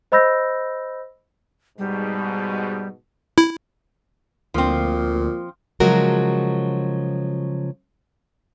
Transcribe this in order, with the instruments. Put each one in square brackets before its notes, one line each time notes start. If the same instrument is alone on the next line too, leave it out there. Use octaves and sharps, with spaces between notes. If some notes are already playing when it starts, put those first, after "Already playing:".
[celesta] C5 D#5 B5 E6 G6 A#6
[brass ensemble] G#2 B2 [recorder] G3
[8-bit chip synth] E4
[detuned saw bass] D2 [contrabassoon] A#2 [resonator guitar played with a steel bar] F3 C4
[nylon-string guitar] C#3 F3 F#3 G#3 F#4 A#4